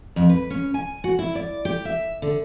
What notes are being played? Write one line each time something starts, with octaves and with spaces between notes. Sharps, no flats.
F2
B4
C#4
G#5
F#4
E4
D5
G4
E5
D3